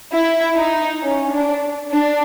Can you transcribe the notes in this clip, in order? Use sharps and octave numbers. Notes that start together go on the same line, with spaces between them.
E4
D#4
C#4
D4
D4